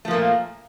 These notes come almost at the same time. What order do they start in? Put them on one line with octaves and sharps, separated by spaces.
A3 F3 A#3 A#2